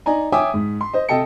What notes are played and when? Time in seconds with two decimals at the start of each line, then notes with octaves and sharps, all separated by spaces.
0.06 D#4 D5 D#5 G#5 A#5
0.32 C#5 E5 G5 G#5 D6 D#6
0.54 G#2
0.81 C6
0.93 C5 D#5
1.09 C3 A4 D#5 G5 A5 C#7